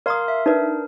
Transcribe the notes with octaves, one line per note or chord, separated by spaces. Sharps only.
A#4 D5 F5 A#5 C6 D#6
E5
D4 D#4 A#4 B4 D5